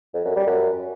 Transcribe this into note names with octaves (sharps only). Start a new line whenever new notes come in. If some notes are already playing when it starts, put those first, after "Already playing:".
F2
F#2
G3
F#2